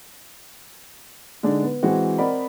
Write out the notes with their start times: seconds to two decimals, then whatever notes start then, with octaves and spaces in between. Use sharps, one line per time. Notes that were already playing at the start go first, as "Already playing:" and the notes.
1.43 D3 G#3 D4 D#4
1.63 B3
1.83 E3 G#3 C4 F#4
2.18 C4 A#4 D5 D#5 F#5 B5